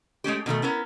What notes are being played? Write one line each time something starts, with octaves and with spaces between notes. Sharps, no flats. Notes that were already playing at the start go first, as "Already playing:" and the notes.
G#3 A3 C#4 G4
B2 D#3 F3 A3
B3 C#4 E4 A#4